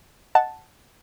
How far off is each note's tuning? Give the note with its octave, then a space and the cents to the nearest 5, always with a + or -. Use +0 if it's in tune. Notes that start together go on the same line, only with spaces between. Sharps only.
D#5 +0 F#5 +0 A5 +0